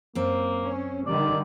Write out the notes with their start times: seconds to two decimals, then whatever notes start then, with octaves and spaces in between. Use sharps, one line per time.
0.15 F#2 A#3 C4
0.62 C#4
1.06 D3 D#3 G3 D5